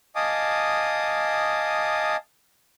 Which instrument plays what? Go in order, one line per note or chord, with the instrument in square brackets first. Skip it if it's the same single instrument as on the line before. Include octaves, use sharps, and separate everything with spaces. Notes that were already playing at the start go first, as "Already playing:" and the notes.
[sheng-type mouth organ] D#5 F5 G#5 A5 D6 D#6